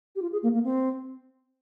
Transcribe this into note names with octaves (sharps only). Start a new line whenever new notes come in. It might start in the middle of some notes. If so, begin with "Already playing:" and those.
G4
F4
G#4
A#3
A#3
C4